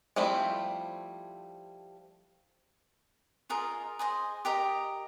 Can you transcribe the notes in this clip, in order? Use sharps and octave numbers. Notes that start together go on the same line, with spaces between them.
F3 G3 A3 C4 E4
F4 G#4 A#4 D#5
G#4 C5 D#5
G4 A#4 D#5